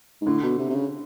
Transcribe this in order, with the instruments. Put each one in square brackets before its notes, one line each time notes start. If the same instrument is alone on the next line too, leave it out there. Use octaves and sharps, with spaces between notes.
[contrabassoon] G#2
[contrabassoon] A2 [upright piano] D3
[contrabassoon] B2
C3
C3
C#3